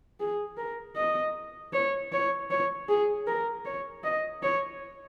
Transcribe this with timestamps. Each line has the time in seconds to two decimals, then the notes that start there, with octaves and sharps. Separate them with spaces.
0.20 G#4
0.57 A#4
0.96 D#5
1.73 C#5
2.12 C#5
2.51 C#5
2.89 G#4
3.27 A#4
3.65 C#5
4.04 D#5
4.43 C#5